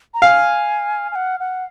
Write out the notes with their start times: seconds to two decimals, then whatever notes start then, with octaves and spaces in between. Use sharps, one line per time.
0.14 A#5
0.22 F5 G#5
1.12 G#5
1.15 F#5
1.40 F#5